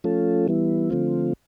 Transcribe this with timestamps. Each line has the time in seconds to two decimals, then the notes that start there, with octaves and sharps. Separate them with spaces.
0.04 F3 A3 C#4 F4 A4
0.48 E3 G3 B3 E4
0.90 D3 F3 A3 C4 F4